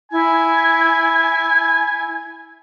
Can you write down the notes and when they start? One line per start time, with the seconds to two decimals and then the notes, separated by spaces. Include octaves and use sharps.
0.12 E4 G#5